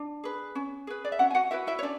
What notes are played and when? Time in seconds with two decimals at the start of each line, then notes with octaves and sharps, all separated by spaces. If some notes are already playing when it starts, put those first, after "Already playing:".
Already playing: D4
0.24 G#4 B4
0.55 C#4
0.87 G#4 B4
1.05 D5
1.12 E5
1.19 C#4 F#4 F#5
1.30 G#5
1.35 F#4 F#5
1.51 E4 F#4 B4 E5
1.67 E4 E5
1.79 C#5
1.82 C#4 D4 D5